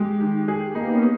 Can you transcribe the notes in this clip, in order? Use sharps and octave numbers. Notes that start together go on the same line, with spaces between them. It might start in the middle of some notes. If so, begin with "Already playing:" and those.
Already playing: G#3 G4
D#3
G#4
A#3 D#4
B3
C#4